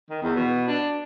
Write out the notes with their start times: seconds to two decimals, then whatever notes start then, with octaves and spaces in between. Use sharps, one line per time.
0.10 D#3
0.22 E2
0.36 B2
0.68 D4